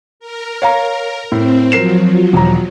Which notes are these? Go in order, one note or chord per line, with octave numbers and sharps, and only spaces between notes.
A#4
C#5 F5 A#5
A2 C4
F3 F#3 A#4 C7 E7
E1 A#5